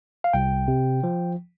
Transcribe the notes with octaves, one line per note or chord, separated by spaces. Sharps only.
F5
C2 G5
C3
F3